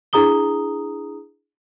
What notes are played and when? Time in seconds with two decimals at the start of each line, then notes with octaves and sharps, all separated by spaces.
0.13 D4 E4 G#4 A#5 D#6 G7